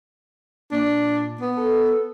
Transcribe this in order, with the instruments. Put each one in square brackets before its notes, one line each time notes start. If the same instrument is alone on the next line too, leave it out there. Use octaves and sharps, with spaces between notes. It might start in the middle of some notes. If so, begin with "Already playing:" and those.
[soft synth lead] A#2 [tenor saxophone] D4
[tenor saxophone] B3
[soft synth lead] A4